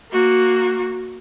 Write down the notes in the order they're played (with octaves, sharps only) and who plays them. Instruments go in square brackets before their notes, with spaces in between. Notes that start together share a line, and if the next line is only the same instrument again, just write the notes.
[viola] A#3 F#4